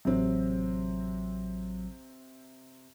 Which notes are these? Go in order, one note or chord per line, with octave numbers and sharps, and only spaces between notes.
A1 C3 F#3 C4